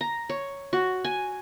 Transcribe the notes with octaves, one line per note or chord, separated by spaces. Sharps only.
A#5
C#5
F#4
G#5